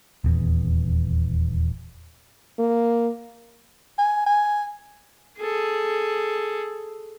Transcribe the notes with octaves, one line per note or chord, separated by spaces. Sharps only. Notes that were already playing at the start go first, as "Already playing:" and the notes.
D#1 E2
A#3
G#5
G#5
G#4 A4